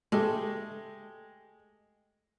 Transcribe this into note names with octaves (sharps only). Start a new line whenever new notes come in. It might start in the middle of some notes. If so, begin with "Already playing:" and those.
G#3 A3 G4